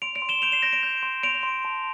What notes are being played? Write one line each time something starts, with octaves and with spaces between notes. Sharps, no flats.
C6 D7 F7
D7 F7
C6
E7 G7
G6 D7 F7
C7 E7
G6 A#6 D7
D7 F7
G6
C6
C6 D7 F7
C6
A5